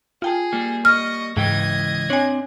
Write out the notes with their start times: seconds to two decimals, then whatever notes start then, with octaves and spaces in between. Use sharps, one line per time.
0.22 F4 G#4 G5 A5
0.53 G3 A#3
0.85 D#5 C#6 F6
1.37 C#2 G#2 E3 D#5 G5 G#6
2.10 C4 D4 C#5 G#5